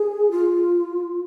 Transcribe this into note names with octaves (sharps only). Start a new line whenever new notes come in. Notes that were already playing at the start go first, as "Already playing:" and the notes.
Already playing: G#4
F4